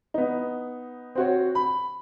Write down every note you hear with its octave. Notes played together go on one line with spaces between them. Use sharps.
B3 D#4
C4 F#4 C#5
B5